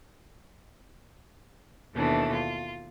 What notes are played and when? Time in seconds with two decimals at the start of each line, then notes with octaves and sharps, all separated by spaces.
1.93 D#2 B2 E3 A3 D4
2.33 F4